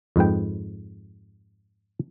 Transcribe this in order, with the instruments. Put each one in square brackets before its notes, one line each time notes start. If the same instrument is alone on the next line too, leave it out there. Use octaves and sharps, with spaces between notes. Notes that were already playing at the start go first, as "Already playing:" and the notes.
[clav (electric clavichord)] F2 G#2 B4 G5